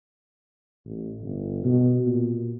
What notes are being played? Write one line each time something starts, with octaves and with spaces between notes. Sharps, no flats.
A1
G1
B2
A#2